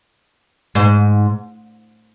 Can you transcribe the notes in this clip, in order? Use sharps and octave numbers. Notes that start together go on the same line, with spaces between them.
G#2